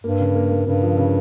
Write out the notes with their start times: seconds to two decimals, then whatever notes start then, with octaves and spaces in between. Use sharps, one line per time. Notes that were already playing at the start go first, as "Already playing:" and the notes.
0.04 G2 A#3
0.19 C#3
0.35 A#3
0.51 A#3
0.67 G2 C#3
0.83 F3
0.98 C#3